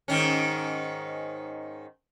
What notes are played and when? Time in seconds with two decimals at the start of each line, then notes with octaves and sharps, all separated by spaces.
0.08 G#2 D#3 C#4